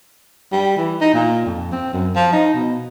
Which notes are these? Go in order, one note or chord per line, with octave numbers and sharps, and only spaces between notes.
G3
E3
D#4
A#2
F2
C4
F#2
F3
D#4
B2